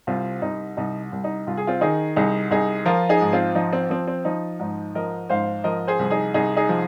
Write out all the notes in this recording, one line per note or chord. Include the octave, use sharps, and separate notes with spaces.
C2 C4 F4
C2 D#4
C2 D#4
C2
D#4
C2 F4
G#4
C4 F4
D#3 D#4 G#4
C2 D#4 G#4
C2 D#4 G#4
F3 F4 A#4
D#4 G#4
G#2
C4 F4
F3 D#4
C4
F3 C4
C4
F3 D#4
G#2 D#4
F3 A#4 D#5
G#2 C5 F5
F3 A#4 D#5
G#4 C5
C2
D#4 G#4
C2 D#4 G#4
D#4 G#4
F3